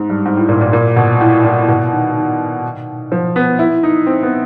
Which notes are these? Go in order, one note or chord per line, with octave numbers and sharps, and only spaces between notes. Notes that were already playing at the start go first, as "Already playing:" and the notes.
Already playing: G#2
G2
G#2
A2
A#2
A#2
A#2
B2
A2
A#2
B2
D#3
D#3
F3
B3
E4
D#4
C4
B3